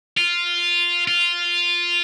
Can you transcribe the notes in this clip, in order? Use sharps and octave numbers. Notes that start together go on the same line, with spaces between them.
F4
F4